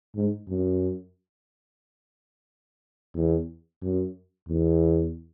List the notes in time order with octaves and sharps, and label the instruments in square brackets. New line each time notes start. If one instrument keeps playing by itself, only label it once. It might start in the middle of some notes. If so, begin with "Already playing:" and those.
[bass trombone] G#2
F#2
E2
F#2
E2